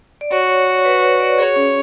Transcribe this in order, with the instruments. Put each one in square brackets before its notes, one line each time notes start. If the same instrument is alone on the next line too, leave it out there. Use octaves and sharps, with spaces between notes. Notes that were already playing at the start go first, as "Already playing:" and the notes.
[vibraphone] D5
[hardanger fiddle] F#4 [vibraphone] C#5
[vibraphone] C#5
C#5
B4
D5
[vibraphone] G#4 [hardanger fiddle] C#5
[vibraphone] C#4